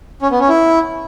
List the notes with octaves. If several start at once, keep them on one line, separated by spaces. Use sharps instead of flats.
C#4
B3
C#4
E4